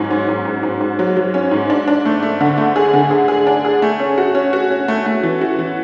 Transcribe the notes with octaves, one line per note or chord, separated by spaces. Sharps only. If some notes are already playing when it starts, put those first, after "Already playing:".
Already playing: G#2 F#3 C#4
G#2
G#2
G#2
G#2
G#2
F#3
F#3
C#4
G#2
D4
D4
A3
A3
D3
A3
G#4
D3
G#4
G#4
D4
G#4
A3
C#4
F#4
C#4
F#4
C#4
A3
A3
E3
F#4
E3